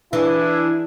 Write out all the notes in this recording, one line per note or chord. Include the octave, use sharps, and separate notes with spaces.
E3 D4 E4 G#4